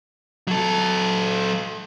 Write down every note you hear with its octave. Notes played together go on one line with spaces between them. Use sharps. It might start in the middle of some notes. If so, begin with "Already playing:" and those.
F#3 A4